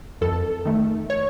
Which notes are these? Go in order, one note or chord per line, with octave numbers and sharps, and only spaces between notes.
F2 A4
D#3 A3
C#5